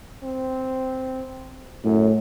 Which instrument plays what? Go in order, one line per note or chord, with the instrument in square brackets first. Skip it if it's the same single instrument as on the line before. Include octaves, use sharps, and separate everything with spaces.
[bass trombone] C4
[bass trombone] F#2 [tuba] A2